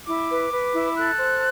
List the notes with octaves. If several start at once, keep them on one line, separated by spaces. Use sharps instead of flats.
E4 D6
B4
B4
E4
A4 F#6
C5